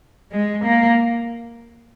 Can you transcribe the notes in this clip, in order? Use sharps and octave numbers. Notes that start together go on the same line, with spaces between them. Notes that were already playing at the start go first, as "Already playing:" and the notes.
G#3
A#3